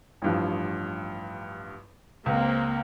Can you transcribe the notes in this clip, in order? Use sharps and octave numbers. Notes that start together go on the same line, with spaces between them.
A1 G2 F3
C#2 A#3 C4